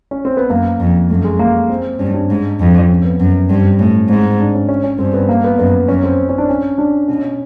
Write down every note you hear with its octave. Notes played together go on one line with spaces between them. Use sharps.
C#4
C4
B3
F#2 A#3
F2
F#2 A3
G#3
A#3
C4
G2 C#4
D4
G#2
F2
C#4
B3
F#2
G2 C4
A2 C#4
G#2 C4
D4
C#4
C#4
C#4
G2 C4
B3
A#3
B3
F#2 B3
F#2 C#4
C4
C#4
D4
C#4
D4
B2 C#4